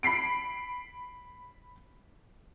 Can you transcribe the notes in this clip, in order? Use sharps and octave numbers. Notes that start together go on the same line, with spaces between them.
B5 B6 C7 D7